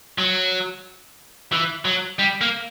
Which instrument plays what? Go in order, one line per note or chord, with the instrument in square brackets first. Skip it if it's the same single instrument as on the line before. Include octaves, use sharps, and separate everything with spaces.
[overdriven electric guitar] F#3
E3
F#3
G3
A#3